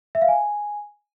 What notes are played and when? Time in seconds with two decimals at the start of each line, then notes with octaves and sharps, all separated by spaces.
0.15 E5
0.22 F5
0.28 G#5